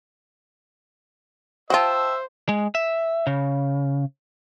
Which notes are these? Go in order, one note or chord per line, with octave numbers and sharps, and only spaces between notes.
F4 F#4 C5 D#5 E5 G5 A5
G#3
E5
C#3